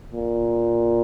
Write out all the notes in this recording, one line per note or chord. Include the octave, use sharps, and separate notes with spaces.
A#2